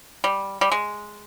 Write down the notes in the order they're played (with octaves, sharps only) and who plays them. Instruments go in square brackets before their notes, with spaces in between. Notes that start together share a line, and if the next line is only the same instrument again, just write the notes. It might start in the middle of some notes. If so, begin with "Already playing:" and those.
[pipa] G3
G3
G#3